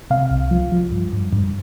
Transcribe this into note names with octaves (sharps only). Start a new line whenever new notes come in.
C3 F5
C2
F3
F3
G2
G2
G2